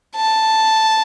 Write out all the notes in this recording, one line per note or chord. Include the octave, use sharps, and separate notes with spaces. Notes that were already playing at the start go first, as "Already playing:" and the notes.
A5